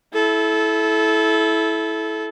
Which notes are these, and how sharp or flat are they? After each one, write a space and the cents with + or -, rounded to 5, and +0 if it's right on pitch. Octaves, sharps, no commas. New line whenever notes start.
E4 -5 A4 -25